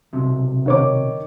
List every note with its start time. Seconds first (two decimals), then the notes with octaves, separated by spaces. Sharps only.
0.13 B1 C3
0.66 D#3 C#5 D6